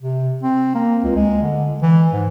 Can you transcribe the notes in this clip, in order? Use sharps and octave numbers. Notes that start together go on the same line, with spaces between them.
C3
C4
A#3
C#2
G#3
D3
E3
G#2